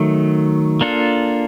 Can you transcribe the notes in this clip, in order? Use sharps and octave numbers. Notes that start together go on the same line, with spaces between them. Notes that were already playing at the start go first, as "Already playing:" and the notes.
Already playing: D#3 F#3 A3
A#3 D4 F4 A4